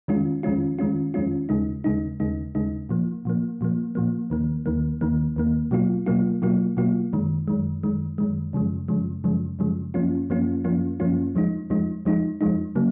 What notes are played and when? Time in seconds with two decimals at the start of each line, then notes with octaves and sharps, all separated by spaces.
0.08 F2 D#3 G#3 C#4 F4
0.43 F2 D#3 G#3 C#4 F4
0.79 F2 D#3 G#3 C#4 F4
1.14 F2 D#3 G#3 C#4 F4
1.49 D#2 C#3 G#3 D#4
1.84 D#2 C#3 G#3 D#4
2.20 D#2 C#3 G#3 D#4
2.55 D#2 C#3 G#3 D#4
2.89 A#2 F3 A#3
3.25 A#2 F3 A#3
3.61 A#2 F3 A#3
3.95 A#2 F3 A#3
4.30 D#2 D#3 A#3
4.66 D#2 D#3 A#3
5.01 D#2 D#3 A#3
5.36 D#2 D#3 A#3
5.71 B2 F#3 A#3 F4
6.06 B2 F#3 A#3 F4
6.42 B2 F#3 A#3 F4
6.77 B2 F#3 A#3 F4
7.13 F#2 D#3 G#3
7.48 F#2 D#3 G#3
7.83 F#2 D#3 G#3
8.18 F#2 D#3 G#3
8.53 F#2 C#3 F3 G#3
8.88 F#2 C#3 F3 G#3
9.24 F#2 C#3 F3 G#3
9.59 F#2 C#3 F3 G#3
9.94 F#2 F3 A#3 C#4 F4
10.30 F#2 F3 A#3 C#4 F4
10.64 F#2 F3 A#3 C#4 F4
11.00 F#2 F3 A#3 C#4 F4
11.35 F2 F3 G#3 D#4
11.70 F2 F3 G#3 D#4
12.05 F2 F3 G#3 D#4
12.41 F2 F3 G#3 D#4
12.75 C#3 F#3 A#3